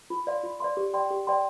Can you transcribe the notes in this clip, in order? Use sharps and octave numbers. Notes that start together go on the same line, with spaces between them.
F4
D5 F5 C6
F4
D5 F5 C6
G4
D5 G5 C6
G4
D5 G5 C6